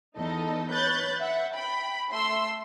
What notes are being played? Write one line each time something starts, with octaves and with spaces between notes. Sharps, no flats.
E2 D#4 A4 D#5
B4 C#5 F#6 G6 A6
E5 F#5
G5 B5
A3 C6 E6